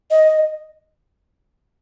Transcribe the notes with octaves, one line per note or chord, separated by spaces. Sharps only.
D#5